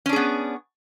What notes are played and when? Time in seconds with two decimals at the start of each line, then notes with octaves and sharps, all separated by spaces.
0.06 C#4
0.09 D4
0.13 G#4
0.16 B3